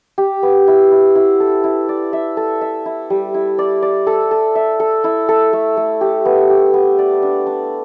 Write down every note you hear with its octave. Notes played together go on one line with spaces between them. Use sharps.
G4
B3
E4
E4
E4
A4
E4
D5
E5
A4
E5
E4
G3
E4
D5
D5
A4
A4
E5
A4
E4
A4
A3
A3
G4
B3
G4
B3
D5
D4
D4